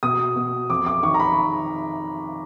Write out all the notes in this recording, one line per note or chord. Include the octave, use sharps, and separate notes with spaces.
B2 D#6
B2
F2 D6
D6
D#3 C#6
A#5
B5